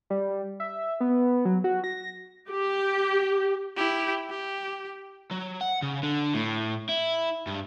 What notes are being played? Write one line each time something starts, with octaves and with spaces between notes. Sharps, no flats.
G3
E5
B3
F#3
F#4
A#6
G4
E4 G4
G4
F#3
F#5
C#3
D3
A2
E4
G2